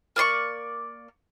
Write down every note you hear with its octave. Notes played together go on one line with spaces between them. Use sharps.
A#3 D5 C6 C#6